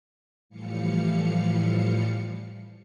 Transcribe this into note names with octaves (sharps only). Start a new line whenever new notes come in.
A2 E3 F3 G3 F5 C#7